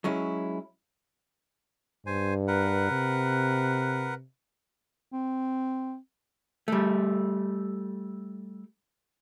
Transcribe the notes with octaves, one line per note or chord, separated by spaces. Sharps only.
F#3 G#3 C#4 E4
G2 C5 G#5
A#4 B4 F#5
C3
C4
G3 A3